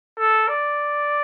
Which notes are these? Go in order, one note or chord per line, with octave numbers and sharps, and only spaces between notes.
A4
D5